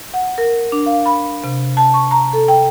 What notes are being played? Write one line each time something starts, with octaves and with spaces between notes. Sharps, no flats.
F#5
A#4
D4
F5
B5
C3
A5
C#6
A#5
A4
G5